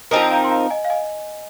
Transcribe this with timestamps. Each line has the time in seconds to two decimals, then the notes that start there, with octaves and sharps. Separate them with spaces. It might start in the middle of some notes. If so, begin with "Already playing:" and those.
0.11 F3 C4 D#4 A#4 A#5 D#6
0.31 F5 A#5
0.44 C6
0.51 F5 A#5
0.70 D#5 G#5
0.85 F5
0.90 D#5 G#5